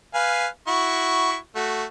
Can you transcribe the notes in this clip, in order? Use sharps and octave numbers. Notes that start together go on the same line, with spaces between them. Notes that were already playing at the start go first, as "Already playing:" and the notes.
B4 F5 G#5
E4 F#4 C#6
A3 F#4